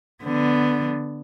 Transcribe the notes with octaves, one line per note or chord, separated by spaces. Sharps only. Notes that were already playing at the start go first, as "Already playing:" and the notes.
D3 B3